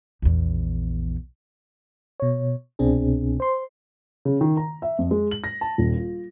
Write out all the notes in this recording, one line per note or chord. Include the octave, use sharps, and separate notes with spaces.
A#1 E2
B2 C#5
C2 B2 C4 D4 G#4
C5 C6
C#3
D#3
A#5
E5
F2
G#3
F#7
A#6
A5
D#1
F4